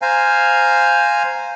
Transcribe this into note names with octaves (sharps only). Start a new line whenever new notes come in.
C5 F5 G#5 A#5